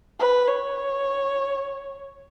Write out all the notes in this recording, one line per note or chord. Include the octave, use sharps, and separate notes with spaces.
B4
C#5